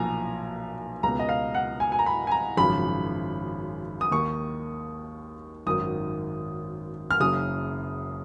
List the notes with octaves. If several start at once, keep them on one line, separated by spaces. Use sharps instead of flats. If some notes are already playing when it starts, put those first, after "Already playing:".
Already playing: B1 A#2 F3 G#5 A#5
C#2 B2 A#5
D#5
F5
F#5
G#5
G#5
A#5
B5
G#5
A#5
G#1 F#2 C#3 F3 B5
D#6
D#2 D#3 C#6
G#1 F#2 D#3 D#6
F6
F#1 F#2 C#3 D#6